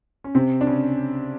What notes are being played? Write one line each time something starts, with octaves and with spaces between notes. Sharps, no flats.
C#4
C3 C4
D4
C#3 C#4